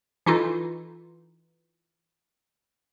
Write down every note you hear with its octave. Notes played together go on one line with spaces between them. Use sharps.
E3 D#4 F4 A4